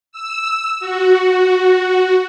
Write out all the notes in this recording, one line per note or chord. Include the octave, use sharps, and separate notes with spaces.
E6
F#4